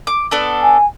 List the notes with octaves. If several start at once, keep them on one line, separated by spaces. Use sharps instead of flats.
D6
B3 D4 A4
G#5